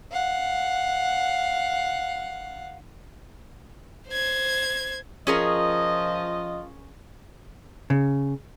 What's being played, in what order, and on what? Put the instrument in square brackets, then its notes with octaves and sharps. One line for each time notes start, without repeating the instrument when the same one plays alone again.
[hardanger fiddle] F5 F#5
[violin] C5 G#6
[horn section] F3 F4 D#5 [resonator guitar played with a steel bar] C#4 G#4 A#4
[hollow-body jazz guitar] C#3